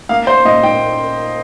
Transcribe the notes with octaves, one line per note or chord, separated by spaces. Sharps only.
A#3 F5
A#3 C5
A#2 D#5
A#2 G5